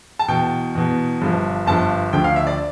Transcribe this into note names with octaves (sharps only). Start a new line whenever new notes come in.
A5
E2 B2 G5
E2 B2
G1 G2 F3
G1 G2 F3 A5
D2 D3 F3 G5
F5
E5
D5